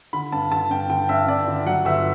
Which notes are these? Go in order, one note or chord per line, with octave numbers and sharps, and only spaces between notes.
D3 B5
G2 A5
D3 A5
G2 G5
D3 G5
G2 E5
G2 D5
D3
F#3 F#5
G1 E5